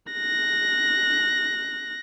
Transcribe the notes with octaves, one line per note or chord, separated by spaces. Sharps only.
F#6 A#6